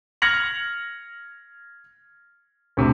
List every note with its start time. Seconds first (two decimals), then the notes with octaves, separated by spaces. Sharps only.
0.22 F6 G#6 A#6 C#7 F7 F#7
2.77 D2 C3